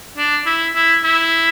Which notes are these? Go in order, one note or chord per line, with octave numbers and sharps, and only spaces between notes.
D4
E4
E4
E4